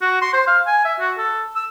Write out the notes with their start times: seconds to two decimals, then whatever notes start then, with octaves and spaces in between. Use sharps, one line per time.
0.02 F#4
0.21 C6
0.33 C5
0.48 F5
0.67 G#5
0.85 E5
1.00 F#4
1.18 A4
1.56 E6